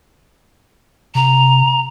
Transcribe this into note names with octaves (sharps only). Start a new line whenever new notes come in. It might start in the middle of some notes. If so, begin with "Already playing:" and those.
C3 A#5